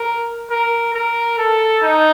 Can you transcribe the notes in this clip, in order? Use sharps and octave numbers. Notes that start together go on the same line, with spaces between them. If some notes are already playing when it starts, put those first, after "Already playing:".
Already playing: A#4
A#4
A#4
A4
D#4